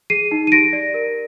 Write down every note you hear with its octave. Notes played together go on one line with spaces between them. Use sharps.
G#4 C7 D#7
D#4
D#7
G4 A#6 D7
D5
A#4